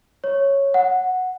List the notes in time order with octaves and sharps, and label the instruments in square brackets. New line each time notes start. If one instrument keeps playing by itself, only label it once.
[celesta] C#5
F#5